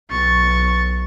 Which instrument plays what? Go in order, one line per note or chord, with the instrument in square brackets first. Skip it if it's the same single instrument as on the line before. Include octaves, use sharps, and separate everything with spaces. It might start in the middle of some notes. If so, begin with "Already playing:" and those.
[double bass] B1 [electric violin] C#6 A6